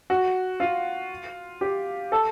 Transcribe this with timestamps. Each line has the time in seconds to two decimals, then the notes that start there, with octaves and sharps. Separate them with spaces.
0.10 F#4
0.60 F4
1.61 G4
2.12 A4